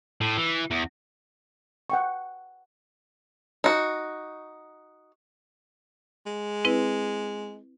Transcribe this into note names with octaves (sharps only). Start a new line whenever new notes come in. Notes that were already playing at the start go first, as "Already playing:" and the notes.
A2
E3
E2
F#5 G5 C#6
D#4 F#4
G#3
C4 E4 B4